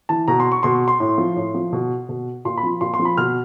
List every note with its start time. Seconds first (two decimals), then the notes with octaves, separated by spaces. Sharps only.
0.09 E3 A5
0.28 B2 A#5
0.40 C6
0.52 C#6
0.63 B2 C6
0.88 C6
1.00 A2
1.18 F3
1.36 A2
1.54 F3
1.73 B2
2.09 B2
2.45 A#2 C6
2.57 B5
2.63 F3
2.81 A#2 C6
2.94 C6
2.99 F3
3.05 B5
3.18 B2 F6